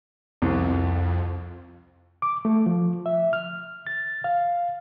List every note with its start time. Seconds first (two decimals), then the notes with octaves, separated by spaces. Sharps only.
0.42 C2 F2
2.22 D6
2.45 A3
2.66 F3
3.06 E5
3.33 F6
3.87 A6
4.24 F5